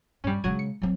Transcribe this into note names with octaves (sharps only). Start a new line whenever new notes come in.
G2 G3 C#4
C#3 F#3 G#3 G#6 D#7
C#7
F#3 C4